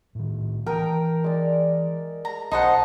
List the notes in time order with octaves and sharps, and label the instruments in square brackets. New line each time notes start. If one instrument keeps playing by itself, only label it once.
[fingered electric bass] A2 D#3
[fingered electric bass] E3 [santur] A#4 D#6 [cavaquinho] G5
[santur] G#3 D5
[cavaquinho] A#5
[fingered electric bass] B1 [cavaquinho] D#4 C5 F#5 [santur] A5